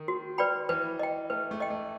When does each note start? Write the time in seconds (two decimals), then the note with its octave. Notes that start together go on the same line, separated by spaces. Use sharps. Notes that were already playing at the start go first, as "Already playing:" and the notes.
Already playing: D#3
0.08 F#4
0.38 B4 D5 G5 B5
0.69 E3 B4
0.99 D#5 G5
1.30 A3 B4
1.51 A3
1.60 D#5 G5
1.70 A3